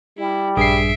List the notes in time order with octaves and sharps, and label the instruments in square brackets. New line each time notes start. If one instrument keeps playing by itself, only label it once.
[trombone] G3 [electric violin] E4
[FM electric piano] A#1 C7 [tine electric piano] G2 G#4 [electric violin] E5 D7